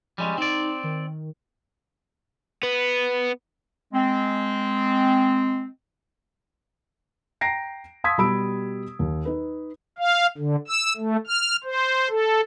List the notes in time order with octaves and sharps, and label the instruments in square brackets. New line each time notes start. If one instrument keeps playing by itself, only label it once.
[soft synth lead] F3 [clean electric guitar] G3 G#3 C#4
[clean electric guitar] C4 D5 [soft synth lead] D#4
[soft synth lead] D#3
[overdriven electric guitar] B3
[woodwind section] G#3 C4
[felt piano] G5 A#5 A#6 C7 D7
F5 C6 D#6 E6 G#6 B6
B2 G3 G4 B5 E6 D7
D#2
D#4 B4
[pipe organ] F5
D3
E6
A3
F6
C5
A4